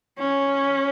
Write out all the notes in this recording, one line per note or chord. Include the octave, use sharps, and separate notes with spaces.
C#4